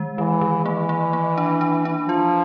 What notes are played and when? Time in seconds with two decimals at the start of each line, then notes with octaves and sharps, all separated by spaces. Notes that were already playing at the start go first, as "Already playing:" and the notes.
Already playing: D#3 G#3
0.18 D#3 E3
0.41 D#3
0.65 E3 A#3
0.89 A#3
1.13 A#3
1.38 D4
1.61 D4
1.85 D4
2.09 F3 F4